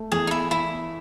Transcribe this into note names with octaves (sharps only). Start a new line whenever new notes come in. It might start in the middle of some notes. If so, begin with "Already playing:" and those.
Already playing: A3
E2 G#4
D#4
E4
E2 E4